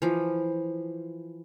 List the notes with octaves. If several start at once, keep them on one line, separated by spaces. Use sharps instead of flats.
E3 F3